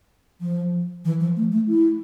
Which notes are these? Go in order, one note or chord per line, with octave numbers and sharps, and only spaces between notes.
F3
E3
F3
A3
A3
E4